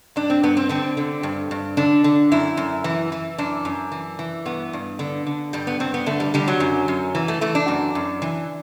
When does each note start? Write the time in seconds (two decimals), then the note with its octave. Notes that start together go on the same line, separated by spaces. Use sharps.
0.16 G2 D4
0.30 C4
0.43 G2 B3
0.57 C4
0.69 D3 C4
0.97 D3
1.23 G2
1.51 G2
1.77 D3 D4
2.04 D3
2.32 F#2 E4
2.57 F#2
2.84 E3
3.12 E3
3.38 F#2 D4
3.65 F#2
3.92 E3
4.19 E3
4.46 G2 B3
4.73 G2
4.99 D3
5.27 D3
5.53 G2 G3
5.67 B3
5.80 G2 C4
5.94 B3
6.06 D3 A3
6.20 G3
6.34 D3 G3
6.48 F#3
6.60 F#2
6.88 F#2
7.15 E3
7.28 A3
7.41 E3 A3
7.55 D4
7.68 F#2
7.95 F#2
8.22 E3